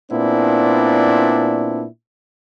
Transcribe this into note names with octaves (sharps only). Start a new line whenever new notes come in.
A#2 B3 C4 D4 E4